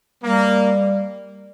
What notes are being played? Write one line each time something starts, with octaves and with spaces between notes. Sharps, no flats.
G3 A#3